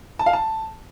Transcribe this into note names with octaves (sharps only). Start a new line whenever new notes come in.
A5
F5
A5